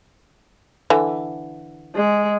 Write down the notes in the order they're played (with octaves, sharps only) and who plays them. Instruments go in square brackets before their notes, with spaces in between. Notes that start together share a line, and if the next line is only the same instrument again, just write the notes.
[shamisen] D3 E3
[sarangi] G#3